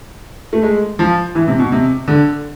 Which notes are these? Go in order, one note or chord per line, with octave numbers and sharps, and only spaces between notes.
A3
G#3
F3
E3
C3
B2
C3
D3